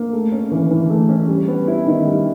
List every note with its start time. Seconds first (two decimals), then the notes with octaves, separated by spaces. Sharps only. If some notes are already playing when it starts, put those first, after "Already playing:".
Already playing: A#3
0.13 A3
0.32 C#4
0.52 E3
0.71 E3
0.90 A3
1.09 C#4
1.28 G3
1.48 B3
1.67 E4
1.86 D#3
2.05 G3